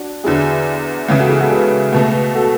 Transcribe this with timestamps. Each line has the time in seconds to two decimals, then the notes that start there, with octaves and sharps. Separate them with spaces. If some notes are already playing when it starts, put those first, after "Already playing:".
Already playing: D4 F#4
0.24 E2 D3 F#3 E4 G#4
1.08 C#2 C#3 E3 G#3
1.19 F#4 A4
1.29 E4 G#4
1.40 F#4 A4
1.50 G#4 B4
1.93 C#2 B2 A3
2.35 F#4 A4